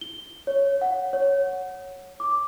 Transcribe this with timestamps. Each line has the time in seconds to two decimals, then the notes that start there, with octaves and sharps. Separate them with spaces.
0.01 G7
0.47 C#5
0.81 F#5
1.13 C#5
2.20 D6